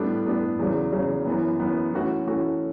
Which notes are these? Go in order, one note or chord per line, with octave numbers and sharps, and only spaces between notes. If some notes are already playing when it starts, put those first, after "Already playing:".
Already playing: A2 G3 B3 D4 A4
A2 G3 B3 D4 A4
E2 C#3 F#3
E2 C#3 F#3
F#2 E3 B3
F#2 E3 B3
E3 A3 C#4 F#4 A4
E3 A3 C#4 F#4 A4